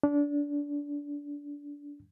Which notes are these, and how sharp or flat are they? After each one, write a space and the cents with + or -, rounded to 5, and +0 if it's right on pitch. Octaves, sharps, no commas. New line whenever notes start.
D4 -25